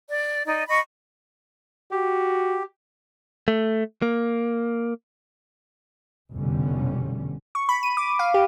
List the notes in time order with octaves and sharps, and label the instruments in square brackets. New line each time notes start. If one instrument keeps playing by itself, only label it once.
[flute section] D5
D#4 D5 D#5
D#5 B5 C#6
[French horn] F#4 [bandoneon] G4
[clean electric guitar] A3
A#3
[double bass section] F1 E2 B2 D3 G3 C#4
[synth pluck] C#6
B5
D#7
D6
F5
G4